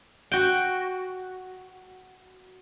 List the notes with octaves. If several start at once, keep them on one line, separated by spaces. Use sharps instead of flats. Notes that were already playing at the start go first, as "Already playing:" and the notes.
F#4 G5